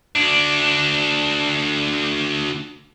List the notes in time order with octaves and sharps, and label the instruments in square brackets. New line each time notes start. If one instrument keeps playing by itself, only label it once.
[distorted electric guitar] D2 D4